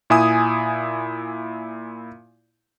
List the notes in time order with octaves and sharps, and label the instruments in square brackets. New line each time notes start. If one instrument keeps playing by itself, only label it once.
[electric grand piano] A#2 E4 G#5 D#6